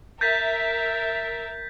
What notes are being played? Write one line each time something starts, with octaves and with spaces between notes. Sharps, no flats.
A#4 E5 G6 A6 B6